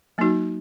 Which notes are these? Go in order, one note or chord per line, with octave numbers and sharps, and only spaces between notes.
F#3 A#3 D#4 F#4